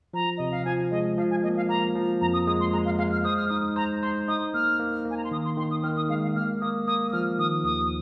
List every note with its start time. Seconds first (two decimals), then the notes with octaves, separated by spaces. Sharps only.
0.14 F3 A#5
0.37 C3 D#5
0.51 F5
0.65 F3 G#5
0.91 G#3 D#5
1.17 F3 F5
1.31 G#5
1.43 A#3 D#5
1.56 F5
1.69 A#3 A#5
1.95 F3
2.21 F2 A#5
2.33 D#6
2.47 G#3 D#6
2.60 C6
2.73 G#3 A#5
2.85 F5
2.98 G#3 F5
3.12 F6
3.24 C5 D#6
3.37 F6
3.48 D#4 D#6
3.76 C5 A#5
4.02 C5 C6
4.28 D#4 D#6
4.54 A#3 F6
4.79 A#3
5.05 A#3
5.11 G#5
5.17 A#5
5.24 C6
5.31 D#3 D#6
5.45 C6
5.57 D#3 C6
5.71 D#6
5.83 D#3 F6
5.96 D#6
6.09 G#3 F5
6.22 F5
6.35 A#3 F6
6.61 A#3 D#6
6.87 A#3 D#6
7.07 D#6
7.13 F3 F6
7.38 D#3 D#6
7.64 D#2 D#6